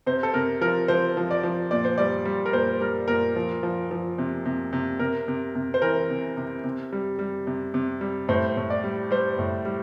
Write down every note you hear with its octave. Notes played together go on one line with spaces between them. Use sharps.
C3 C5
A4
C3 A#4
F3 A#4
F3 C5
F3
D5
F3
A#2 D5
C5
G3 D5
G3
A#4
A#2 C5
G3 A#4
A#2 A#4
F3
F3
F3
C3
C3
C3
C3 A#4
C3
C3
C5
E3 A#4
C3
C3
C3
G3
G3
C3
C3
G3
A2 C5
A2
D5
G3
G3 C5
A2
G3